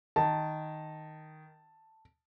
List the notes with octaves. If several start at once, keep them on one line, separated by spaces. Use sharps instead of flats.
D#3 A5